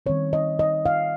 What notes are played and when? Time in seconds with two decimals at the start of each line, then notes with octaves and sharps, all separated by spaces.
0.06 D#3 G3 C4 C#5
0.33 D#5
0.59 D#5
0.86 F5